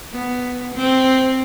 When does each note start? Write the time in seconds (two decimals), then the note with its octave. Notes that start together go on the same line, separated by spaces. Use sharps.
0.12 B3
0.75 C4